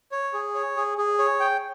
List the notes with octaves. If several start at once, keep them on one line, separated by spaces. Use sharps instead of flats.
C#5
G#4
C#5
G#4
G#4
C#5
G5